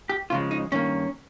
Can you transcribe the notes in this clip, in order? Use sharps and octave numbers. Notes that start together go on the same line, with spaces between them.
G4
C#2 C#3 F3 G#3 F4
D#4
G2 D#3 A#3 C#4